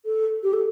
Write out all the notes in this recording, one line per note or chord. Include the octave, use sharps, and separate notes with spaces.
A4
G4
A4